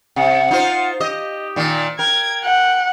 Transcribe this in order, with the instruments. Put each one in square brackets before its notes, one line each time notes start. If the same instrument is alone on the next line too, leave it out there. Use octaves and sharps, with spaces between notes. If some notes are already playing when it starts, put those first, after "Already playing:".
[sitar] C3 [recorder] F#5
[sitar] D#4 F4 C5
[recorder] G4 [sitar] D#5
[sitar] A#2 D#3
[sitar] A#4 [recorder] G5 [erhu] G#6
[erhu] F#5